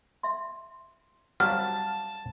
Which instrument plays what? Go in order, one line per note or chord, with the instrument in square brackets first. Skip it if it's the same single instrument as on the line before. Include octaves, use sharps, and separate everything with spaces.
[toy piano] E5 C6
[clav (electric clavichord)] F#3 G3 C4 [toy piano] F5 F#5 [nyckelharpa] A5 [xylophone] F6